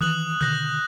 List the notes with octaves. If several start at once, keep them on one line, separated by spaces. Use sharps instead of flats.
D#3 E3 D#6 F#6 F#7
B2 D3 D#3 F#6 G6 A#6